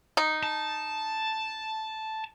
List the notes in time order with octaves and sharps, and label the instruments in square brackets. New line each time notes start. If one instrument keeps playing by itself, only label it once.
[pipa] D#4
[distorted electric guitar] A5